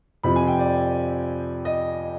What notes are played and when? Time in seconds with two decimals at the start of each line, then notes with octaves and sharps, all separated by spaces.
0.23 F2 C3 F3 C4 B5
0.36 G#5
0.48 G5
0.59 D5
1.65 D#5